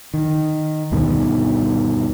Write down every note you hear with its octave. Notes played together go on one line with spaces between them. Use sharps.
D#3
D2 G2 B2 D#3